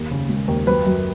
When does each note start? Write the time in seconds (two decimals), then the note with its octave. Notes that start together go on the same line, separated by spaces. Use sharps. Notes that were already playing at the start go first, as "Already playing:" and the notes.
Already playing: D#2
0.11 C#3
0.29 G#3
0.48 D#2
0.67 F#2 B4
0.86 F#2